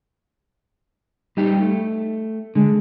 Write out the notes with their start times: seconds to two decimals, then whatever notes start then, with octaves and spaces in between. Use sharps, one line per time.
1.37 G3 D#4 G4
1.61 A3
2.55 D3 G#3